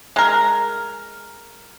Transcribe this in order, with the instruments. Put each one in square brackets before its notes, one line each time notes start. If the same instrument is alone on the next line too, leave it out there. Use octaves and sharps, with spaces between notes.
[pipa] G#3 A#4